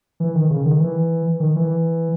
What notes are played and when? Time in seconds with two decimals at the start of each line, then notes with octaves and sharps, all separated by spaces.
0.20 E3
0.35 D#3
0.50 C#3
0.66 D#3
0.80 E3
1.40 D#3
1.56 E3